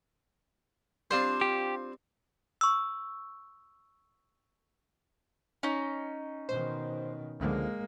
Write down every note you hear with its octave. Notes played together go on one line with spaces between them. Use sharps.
G3 C4 D4 F4 C5
G4
C#6 E6
C#4 D#4
B2 D#3 C5
C#2 D3 F3 G#3 A#3